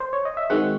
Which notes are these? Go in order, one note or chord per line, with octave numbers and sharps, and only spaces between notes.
C5
C#5
D#5
E5
D#3 G#3 C4 F#4 F#5